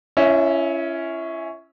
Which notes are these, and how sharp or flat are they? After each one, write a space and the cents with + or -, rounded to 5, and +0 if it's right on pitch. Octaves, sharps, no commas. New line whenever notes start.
C#4 +0 E4 +40 E5 -25